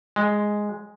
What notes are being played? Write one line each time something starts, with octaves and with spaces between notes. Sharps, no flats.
G#3